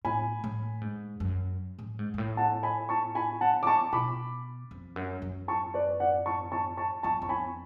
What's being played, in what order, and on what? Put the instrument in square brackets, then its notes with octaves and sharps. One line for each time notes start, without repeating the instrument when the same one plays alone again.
[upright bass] A2 [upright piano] G#5 B5
[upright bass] A2
G#2
F#2
A2
G#2
G#2
A2
[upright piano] F#5 A5
G#5 B5
A5 C#6
G#5 B5
F#5 A5
D6
A5 C#6
[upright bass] B2 [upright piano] B5 D6
[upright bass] F2
F#2
F#2
[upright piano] A5 C#6
B4 D5
D5 F#5
A5 C#6
A5 C#6
A5 C#6
[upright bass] F2 [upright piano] A5 C#6
[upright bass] F2 [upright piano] C#6
[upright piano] G#5 B5